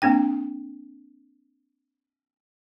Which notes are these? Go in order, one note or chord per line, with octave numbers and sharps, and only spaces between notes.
A#3 C4 D4 G5